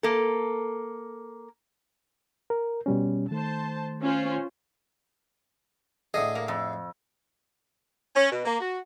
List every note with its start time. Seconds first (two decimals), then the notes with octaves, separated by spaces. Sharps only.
0.03 A#3 A4
2.50 A#4
2.86 B2 G3 C#4
3.31 D#3 A3 C5 A5
4.01 C#4 F4 C5
6.14 A2 D3 G#4 D#5
6.35 A#3
6.48 F2
8.14 C#4
8.30 B2
8.44 A#3
8.59 F#4